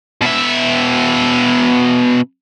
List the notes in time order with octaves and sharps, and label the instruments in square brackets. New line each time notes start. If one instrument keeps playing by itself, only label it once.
[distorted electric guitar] B2 E5